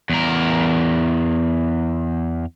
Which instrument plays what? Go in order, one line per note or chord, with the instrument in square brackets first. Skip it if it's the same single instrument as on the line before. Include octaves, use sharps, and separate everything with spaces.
[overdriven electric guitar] E2 A#4